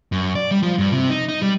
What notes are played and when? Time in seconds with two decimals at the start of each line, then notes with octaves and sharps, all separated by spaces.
0.12 F#2
0.35 D5
0.51 G3
0.63 F3
0.78 G2
0.92 C3
1.09 D#4
1.28 D#4
1.42 G3